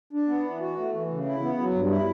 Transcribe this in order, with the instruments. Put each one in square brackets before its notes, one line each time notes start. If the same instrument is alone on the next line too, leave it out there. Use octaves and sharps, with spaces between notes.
[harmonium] D4
B3
E3
F#4
A3
E3
C#3
E4
B3
F#3
G2
E4